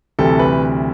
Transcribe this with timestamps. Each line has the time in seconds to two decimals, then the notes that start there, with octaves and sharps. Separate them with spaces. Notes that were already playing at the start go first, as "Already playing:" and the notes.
0.19 D2 C3 E3 G3 A4
0.39 B4